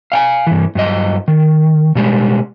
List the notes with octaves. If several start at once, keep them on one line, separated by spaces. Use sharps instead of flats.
F5 G5 G#5
G2 E3
G2 F#3 D#5
D#3
B2 G3 G#3